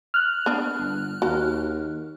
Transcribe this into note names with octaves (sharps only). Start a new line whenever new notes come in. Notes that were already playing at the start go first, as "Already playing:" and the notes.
F6 F#6
B3 D4
G1
D#2 F#4 A#5